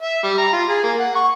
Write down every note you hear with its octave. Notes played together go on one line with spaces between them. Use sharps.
E5
G3
A#5
F4
G#4
A#3
F#5
C#6